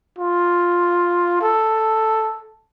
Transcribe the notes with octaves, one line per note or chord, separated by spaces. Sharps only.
F4
A4